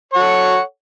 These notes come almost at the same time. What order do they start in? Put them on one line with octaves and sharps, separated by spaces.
C#5 F#5 A4